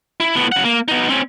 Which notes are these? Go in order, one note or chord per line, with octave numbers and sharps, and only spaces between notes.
E4
A2 B3
C#3 F#5
A#3
B3 D#4
C4 C#4